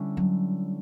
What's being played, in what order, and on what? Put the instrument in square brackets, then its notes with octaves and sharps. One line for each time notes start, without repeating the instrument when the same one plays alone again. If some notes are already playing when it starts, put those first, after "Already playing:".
Already playing: [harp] D3 G3 C#4 E4
[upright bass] F#3